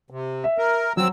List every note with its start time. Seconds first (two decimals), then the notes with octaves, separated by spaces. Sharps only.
0.10 C3
0.44 E5
0.58 A#4
0.97 F#3 C4 E6